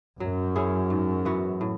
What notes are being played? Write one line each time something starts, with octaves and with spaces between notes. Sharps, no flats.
F#2 F#3
C#4 E4 G#4
G#2
E3 B3 F#4
A2